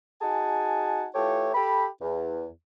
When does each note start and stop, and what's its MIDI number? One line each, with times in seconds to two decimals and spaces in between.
0.21 1.05 63
0.21 1.05 66
0.21 1.05 68
0.21 1.05 80
0.21 1.05 81
1.14 1.49 52
1.14 1.49 57
1.14 1.49 65
1.14 1.49 67
1.14 1.49 69
1.14 1.49 73
1.54 1.87 67
1.54 1.87 69
1.54 1.87 83
2.01 2.46 40